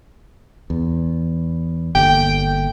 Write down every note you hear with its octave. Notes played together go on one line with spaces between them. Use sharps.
E2
G1 D3 A#3 G5